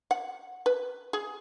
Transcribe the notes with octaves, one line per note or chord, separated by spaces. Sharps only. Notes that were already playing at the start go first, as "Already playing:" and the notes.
F#5
B4
G#4